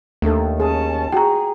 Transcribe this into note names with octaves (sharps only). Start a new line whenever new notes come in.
D#2 A3 D4 A4
C#4 G#4 A5
F4 F#4 G#4 G5 A#5